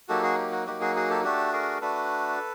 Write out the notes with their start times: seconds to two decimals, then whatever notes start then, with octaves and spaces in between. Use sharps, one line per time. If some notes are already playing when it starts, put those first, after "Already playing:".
0.08 F#3 A#3 D#4 F#4 G4 A4
0.23 F#4 G#4
0.38 G4
0.52 F#4
0.66 F#3 A#3 D#4 F#4 G4
0.81 F#4 G#4
0.96 F#4 G#4
1.09 G4 A4
1.24 A3 D4 F#4 G4 A4
1.52 G#4 A#4
1.81 A3 D4 F#4 A4 B4